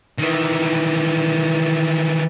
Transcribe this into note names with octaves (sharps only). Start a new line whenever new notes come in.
D#3 E3